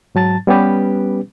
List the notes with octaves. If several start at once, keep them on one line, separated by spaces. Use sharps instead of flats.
G#2 F#3 A5 A6
G3 B3 C#4 G4 B4